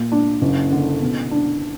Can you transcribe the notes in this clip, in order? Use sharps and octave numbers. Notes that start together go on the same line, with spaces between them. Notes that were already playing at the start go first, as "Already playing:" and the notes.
Already playing: A#2
D4
F#1
D3
B2
D4